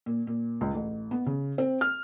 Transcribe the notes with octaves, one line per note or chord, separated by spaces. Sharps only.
A#2
A#2
C#2
A1
B3
C#3
C4
F6